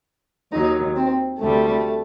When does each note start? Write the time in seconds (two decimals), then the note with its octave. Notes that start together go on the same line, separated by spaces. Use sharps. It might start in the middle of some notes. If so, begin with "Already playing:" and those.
0.52 D#2 D#3 F#3 D#4
0.96 C4
1.39 D2 C3 G3 A3